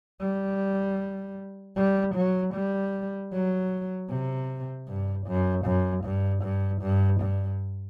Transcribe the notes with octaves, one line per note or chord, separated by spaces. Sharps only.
G3
G3
F#3
G3
F#3
C3
G2
F#2
F#2
G2
G2
G2
G2